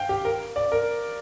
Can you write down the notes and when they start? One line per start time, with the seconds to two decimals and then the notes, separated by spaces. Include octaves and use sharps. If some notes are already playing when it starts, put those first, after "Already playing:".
Already playing: F5 G5
0.09 G4
0.25 A#4
0.56 D5
0.72 A#4